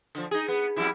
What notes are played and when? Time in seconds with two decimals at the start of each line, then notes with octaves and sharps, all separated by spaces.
0.15 D3 F3
0.31 D#4 G#4
0.48 B3
0.76 F2 G3 E4